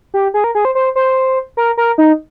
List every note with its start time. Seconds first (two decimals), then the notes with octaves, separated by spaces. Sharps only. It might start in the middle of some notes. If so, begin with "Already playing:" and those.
0.14 G4
0.34 G#4
0.44 A#4
0.55 G#4
0.65 C5
0.75 C5
0.96 C5
1.57 A#4
1.77 A#4
1.98 D#4